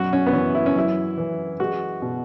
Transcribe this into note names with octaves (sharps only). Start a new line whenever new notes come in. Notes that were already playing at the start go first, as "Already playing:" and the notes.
Already playing: F#2 B2 F#4
C#4
B3
E3 C#4
E4
C#4
F#2 E4
E3
G#3 F#4
B2